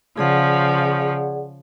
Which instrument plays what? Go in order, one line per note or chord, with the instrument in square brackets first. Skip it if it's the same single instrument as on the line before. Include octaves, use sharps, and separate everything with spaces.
[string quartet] C#3 F3 [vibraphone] G#4 D5 F#5